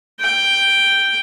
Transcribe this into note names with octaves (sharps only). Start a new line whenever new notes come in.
G5